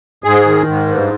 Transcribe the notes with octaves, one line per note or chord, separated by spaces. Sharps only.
G#2 G#4
D#3
G#2
G2